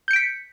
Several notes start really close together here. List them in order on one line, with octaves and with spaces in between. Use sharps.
G6 C#7 D7 B6